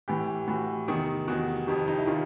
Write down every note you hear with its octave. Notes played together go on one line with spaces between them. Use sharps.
A2 E3 G4
A2 E3 F#4
E2 C3 D#3
E2 C3 D#3 F#4
F2 C3 D#3 G4
D#4
E4
C3 D#3 F4